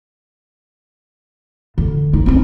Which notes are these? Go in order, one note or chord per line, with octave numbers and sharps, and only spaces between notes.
D3
D#4
C4 C#4